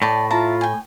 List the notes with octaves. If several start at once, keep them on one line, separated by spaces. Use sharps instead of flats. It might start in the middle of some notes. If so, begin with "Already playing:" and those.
A2 D5 G5 A5
E4 F4 A5 A#5
G5 G#5